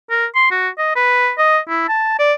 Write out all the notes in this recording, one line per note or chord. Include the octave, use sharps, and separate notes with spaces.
A#4
C6
F#4
D#5
B4
D#5
E4
A5
D5